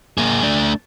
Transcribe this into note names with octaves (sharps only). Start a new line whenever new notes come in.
A#3 G#4
A3 D4